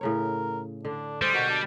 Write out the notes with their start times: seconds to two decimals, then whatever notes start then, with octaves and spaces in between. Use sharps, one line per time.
0.01 A2 C#3 A#4 C#5
0.85 D3 D4
1.22 G3 G#3 C5
1.34 B2 F#4 A#4 F#5
1.49 D4